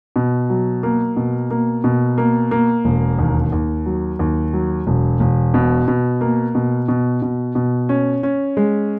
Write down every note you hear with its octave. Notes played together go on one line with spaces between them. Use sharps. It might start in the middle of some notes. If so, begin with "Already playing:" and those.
B2
F#3
A#3
B2
A#3
B2
A#3
A#3
E1
D#2
D#2
F#3
D#2
F#3
E1
E1
B2
B2
A#3
B2
B2
B2
B2
C#4
C#4
G#3